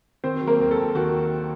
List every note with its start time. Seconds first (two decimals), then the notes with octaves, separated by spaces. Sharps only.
0.24 D#3 C4 C5
0.41 F#3
0.47 A#3 A#4
0.60 D#2
0.71 A4
0.78 D#2
0.95 D#3 F#4